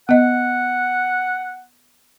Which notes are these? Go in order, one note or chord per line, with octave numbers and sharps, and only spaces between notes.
B3 D#5 F#5